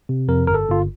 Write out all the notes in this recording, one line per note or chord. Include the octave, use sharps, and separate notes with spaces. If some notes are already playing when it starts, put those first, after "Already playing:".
C3
F2 A#4
G1 A#4
A4
G1 F4